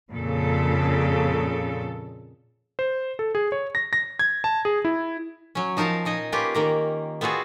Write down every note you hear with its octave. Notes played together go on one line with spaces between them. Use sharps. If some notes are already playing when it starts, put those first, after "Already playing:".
F2 A#2 C#3 A4
C5
A4
G#4
C#5
A#6
A#6
G#6
A5
G#4
E4
F#3 C#4
F3 D#4 A#4 F5 A5
A#2 D#4 D#5 G#5
A#3 C#4 F4 G4 B4
D#3 A#3 A#5
B3 C4 F4 F#4 G#4